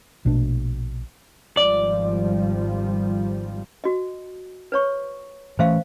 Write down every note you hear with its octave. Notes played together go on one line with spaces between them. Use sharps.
A#1 B2 A3 D4
G#1 F3 G3 D5
F#4 D#5
B4 C#5 C#6
E3 A3 C#4 C5 E5 F5